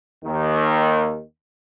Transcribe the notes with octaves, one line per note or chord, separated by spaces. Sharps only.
D#2 D#3